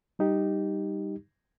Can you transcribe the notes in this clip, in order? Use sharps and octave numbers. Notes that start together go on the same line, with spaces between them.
G3 D#4 G4